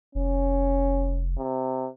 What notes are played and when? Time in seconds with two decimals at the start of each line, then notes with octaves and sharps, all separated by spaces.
0.15 F1 C#4
1.38 C3